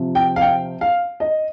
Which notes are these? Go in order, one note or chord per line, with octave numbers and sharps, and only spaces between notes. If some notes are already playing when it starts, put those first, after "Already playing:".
Already playing: C3 F3 C4
G5
F5
G5
F5
D#5